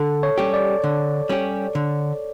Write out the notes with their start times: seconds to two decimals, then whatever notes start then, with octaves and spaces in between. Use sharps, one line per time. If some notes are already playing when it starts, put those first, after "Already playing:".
Already playing: D3 A4
0.23 C#5
0.38 G3 C#4 G4
0.54 D5
0.84 D3
1.29 G3 C#4 G4
1.75 D3